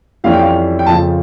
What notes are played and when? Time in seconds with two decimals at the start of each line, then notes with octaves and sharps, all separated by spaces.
0.24 F2 E3 G3 C#4 F5
0.33 G5
0.42 F5
0.79 G5
0.86 F2 C#3 F3 A5